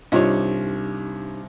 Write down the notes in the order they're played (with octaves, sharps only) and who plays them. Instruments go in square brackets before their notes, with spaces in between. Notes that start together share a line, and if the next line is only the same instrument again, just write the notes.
[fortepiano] C2 G2 C#5 [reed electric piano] D4 D#4 G4 [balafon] F4 D#5